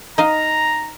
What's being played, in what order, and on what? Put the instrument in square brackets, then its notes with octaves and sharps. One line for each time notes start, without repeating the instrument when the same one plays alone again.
[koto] D#4 D#5 F5 [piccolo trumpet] A#5